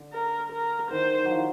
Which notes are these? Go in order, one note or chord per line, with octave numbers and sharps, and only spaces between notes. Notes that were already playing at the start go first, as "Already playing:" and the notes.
Already playing: D3
A#4
A#4
D#3 C5
F#3
F3